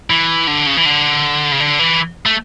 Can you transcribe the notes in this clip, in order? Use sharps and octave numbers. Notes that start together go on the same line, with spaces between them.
E3
D3
C#3
E3
D3
C#3
D3
E3
A3